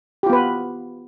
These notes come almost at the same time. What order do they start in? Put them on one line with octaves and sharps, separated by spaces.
G4 F4 B3 B4